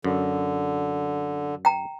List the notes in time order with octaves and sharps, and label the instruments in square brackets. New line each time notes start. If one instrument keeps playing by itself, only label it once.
[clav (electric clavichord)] F#2 [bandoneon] D3
[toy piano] G5 A#5